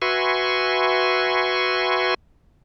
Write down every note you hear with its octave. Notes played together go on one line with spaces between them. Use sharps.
F#4 B4 E5 G#5 C6 C#6